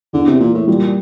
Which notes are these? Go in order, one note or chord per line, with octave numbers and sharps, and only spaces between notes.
E2 D3
C3
A#2 E3
A2
A#2 G3